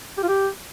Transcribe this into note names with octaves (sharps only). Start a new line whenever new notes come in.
G4
F4
G4